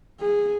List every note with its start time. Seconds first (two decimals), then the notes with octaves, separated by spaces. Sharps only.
0.20 G#4